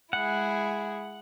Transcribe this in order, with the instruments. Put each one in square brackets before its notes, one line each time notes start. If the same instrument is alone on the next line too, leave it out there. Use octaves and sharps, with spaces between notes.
[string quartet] G#3 E4 G#4 [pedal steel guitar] F#5